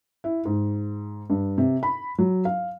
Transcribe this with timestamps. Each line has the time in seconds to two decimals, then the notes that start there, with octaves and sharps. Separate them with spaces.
0.24 E4
0.45 G#2
1.30 G2
1.58 C3
1.83 B5
2.18 F#3
2.45 F5